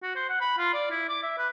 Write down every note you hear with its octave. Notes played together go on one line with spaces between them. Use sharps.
F#4
C5
F#5
B5
F4
D5
E4
D6
E5
B4